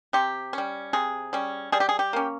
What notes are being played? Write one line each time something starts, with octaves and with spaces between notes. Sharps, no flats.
C3 G4
G3 C#4
C3 G#4
G3 C#4
G3 G#4
G4
G#4
G4
A#3 C#4